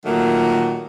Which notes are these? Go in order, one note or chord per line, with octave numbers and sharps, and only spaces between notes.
A#2 D#3 F#3 A3 A#3